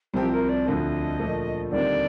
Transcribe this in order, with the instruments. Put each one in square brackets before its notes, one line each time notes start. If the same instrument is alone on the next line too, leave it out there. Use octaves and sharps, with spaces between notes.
[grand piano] C2 C3 F3 C4 [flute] G4
[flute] A#4
D5
[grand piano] D2 D3 F3 [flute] D#5
[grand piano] A#2 F3 A3 D4
[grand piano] D#2 D3 G3 C4 D#4 [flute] D5